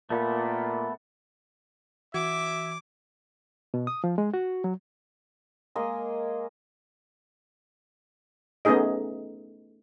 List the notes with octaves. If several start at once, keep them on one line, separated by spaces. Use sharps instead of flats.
A#2 A3 B3
E3 F#4 E5 D6 G#6
B2
D#6
F3
G#3
F#4
F#3
G#3 A#3 D#5 G#5
A3 B3 C#4 D#4 G#4 D#5